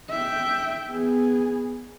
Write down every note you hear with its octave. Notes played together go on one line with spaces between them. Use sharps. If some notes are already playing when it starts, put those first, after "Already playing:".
E5 G5
B3 G#4